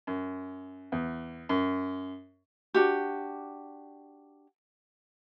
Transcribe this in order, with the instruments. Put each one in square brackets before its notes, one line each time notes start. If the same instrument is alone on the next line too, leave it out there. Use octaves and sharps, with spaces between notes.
[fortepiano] F#2
E2
F#2
[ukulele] D4 F#4 G4